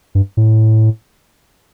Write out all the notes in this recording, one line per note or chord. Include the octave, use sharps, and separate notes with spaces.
G2
A2